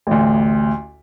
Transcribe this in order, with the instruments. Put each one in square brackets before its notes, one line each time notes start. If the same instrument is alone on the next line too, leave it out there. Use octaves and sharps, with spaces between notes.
[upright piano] A1 D2